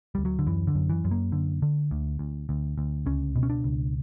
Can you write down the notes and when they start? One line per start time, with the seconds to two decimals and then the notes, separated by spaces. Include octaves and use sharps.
0.15 D2 G3
0.25 F#3
0.39 D3
0.46 F#2 E3
0.67 D3
0.75 F#2
0.89 E3
1.04 F#2
1.11 A#3
1.32 D3
1.62 D3
1.91 D2
2.19 D2
2.49 D2
2.78 D2
3.06 C#2 C#4
3.36 B2
3.43 C#4
3.50 D4
3.64 C#2